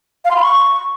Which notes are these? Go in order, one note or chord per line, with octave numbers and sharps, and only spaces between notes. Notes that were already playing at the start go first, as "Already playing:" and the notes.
F5
C6
B5
C#6